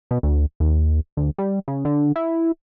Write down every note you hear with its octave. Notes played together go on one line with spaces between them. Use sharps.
B2
D2
D#2
D2
G3
C#3
D3
E4